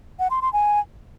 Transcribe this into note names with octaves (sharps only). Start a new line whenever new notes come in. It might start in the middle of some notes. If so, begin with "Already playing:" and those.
F#5
C6
C6
G#5